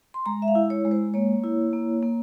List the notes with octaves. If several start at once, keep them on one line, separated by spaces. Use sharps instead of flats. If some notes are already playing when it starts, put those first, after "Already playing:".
C6
G#3 A#5
E5
F5
E4
C#5
G#3
C5
A#3 C#5
E4
A#3
A#3